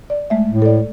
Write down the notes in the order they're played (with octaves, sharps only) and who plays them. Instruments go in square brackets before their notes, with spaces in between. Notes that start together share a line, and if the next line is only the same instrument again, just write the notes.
[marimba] D5
G#3 A3 E5
[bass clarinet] A2
[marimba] A4 D5